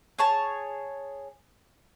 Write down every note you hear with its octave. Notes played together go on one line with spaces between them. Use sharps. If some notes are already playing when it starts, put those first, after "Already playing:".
G#4 C#5 A5